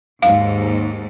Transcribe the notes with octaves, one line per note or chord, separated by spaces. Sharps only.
D#2 G#2 F5